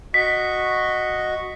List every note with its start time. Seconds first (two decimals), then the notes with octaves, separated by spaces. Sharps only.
0.14 F#4 D#5 C#6 B6